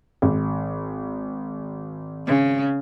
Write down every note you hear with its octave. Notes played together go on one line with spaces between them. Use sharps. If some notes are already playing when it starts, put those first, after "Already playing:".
G#1
C#3